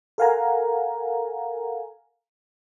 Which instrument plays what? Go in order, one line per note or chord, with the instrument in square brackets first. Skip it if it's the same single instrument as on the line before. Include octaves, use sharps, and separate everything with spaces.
[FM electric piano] A4 A#4 F5 F#5 G#5 A#5